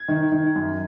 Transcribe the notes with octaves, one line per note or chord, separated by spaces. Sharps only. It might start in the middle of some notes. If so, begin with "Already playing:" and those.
Already playing: G#6
D#3
D#3
F#2